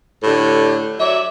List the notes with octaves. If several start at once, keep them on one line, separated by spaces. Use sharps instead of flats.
A2 D3 G4
F#3 D5 E5